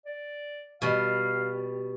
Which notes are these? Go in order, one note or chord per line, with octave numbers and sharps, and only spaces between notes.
D5
B2 G3 F5